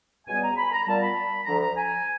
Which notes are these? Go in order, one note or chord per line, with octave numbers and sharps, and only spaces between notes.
C#2 B2 G3 B3 G#5
A#5
B5
A#5
A#2 G3 B3 A5
B5
D2 D3 F3 A#5
A#5
G#5